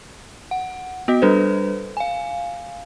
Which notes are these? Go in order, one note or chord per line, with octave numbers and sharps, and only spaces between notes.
F#5
B3 F#4 D#5
G3 D4 A4 B4 C5
F5 G#5